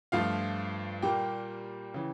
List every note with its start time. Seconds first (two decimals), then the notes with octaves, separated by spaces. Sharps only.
0.12 G2 F3 A3 F4 F5
1.02 A#2 G3 A#3 G4 G5
1.94 C#3 E3